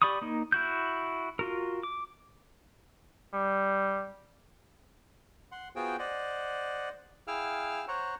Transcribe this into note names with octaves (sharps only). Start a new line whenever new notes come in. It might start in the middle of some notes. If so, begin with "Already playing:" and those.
G4 D5 B5 C#6 D#6
A#3 D#4
E4 F#4 G6
F4 F#4 A#4
D6
G3
F#5 C6
B3 F4 F#4 G#4 C5 G5
C5 D5 D#5 F#5
E4 G#4 F5 G5 E6 F6
C5 C#5 F#5 A#5 C#6